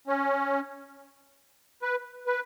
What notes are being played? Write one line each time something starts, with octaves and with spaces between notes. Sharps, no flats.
C#4
B4
B4